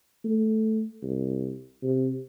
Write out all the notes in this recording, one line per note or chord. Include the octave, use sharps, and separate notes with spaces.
A3
C2
C3